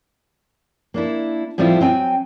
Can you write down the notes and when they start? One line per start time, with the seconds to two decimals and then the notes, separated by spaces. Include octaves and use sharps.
0.94 A#3 D4 E4
1.58 A2 F3 G3 C4 E4 F4
1.81 F#3 C4 G5 G#5